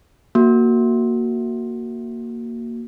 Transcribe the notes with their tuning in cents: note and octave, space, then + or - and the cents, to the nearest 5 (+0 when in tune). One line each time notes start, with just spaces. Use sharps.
A#3 +0 F#4 +0